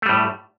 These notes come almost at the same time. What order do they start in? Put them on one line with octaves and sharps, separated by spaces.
A3 G3 A2